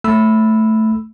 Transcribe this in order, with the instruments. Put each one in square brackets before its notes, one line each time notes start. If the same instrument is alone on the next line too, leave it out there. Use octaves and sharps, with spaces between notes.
[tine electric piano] A3 B5 E6